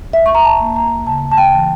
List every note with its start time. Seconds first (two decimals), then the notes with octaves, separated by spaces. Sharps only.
0.13 D2 E5
0.26 C#6
0.35 A#5
0.45 A5
0.60 A#3
0.76 A#5
1.06 C#3 A5
1.32 A5
1.37 G5
1.53 E3